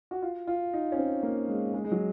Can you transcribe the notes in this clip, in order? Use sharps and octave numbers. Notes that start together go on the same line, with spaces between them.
F#4
F4
F4
D#4
C#4
C4
A#3
G#3
G#3
G#3
F#3